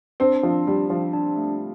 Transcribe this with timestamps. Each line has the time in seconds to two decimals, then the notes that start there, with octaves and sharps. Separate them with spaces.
0.20 C4 D4
0.43 F3 D4
0.66 G3 F4
0.90 F3 D4
1.13 D4
1.37 A3